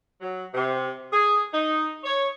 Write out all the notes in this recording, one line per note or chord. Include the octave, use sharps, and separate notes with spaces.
F#3
C3
G#4
D#4
C#5